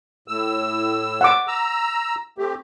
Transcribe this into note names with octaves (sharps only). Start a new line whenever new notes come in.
A2 E6
F#5 D6
A#5 E6
A3 C4 G4